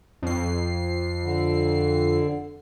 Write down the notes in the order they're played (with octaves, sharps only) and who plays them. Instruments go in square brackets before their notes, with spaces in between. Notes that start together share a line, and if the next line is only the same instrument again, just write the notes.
[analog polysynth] F2 C7
[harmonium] D3